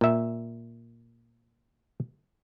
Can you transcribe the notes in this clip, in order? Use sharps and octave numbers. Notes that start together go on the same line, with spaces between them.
A#2 E5